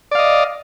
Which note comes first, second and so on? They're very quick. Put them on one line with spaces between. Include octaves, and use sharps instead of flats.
D5 F5 D#5